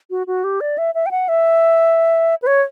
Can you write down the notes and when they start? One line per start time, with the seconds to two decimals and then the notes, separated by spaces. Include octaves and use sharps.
0.10 F#4
0.27 F#4
0.44 G4
0.61 D5
0.78 E5
0.95 E5
1.06 G5
1.11 F#5
1.29 E5
2.42 B4
2.47 C#5